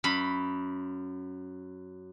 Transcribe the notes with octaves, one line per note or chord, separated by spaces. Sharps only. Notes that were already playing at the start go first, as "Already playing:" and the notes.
F#2 B5